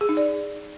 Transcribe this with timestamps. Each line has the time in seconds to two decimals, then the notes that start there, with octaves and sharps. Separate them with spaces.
0.01 G#4
0.09 D#4
0.17 D5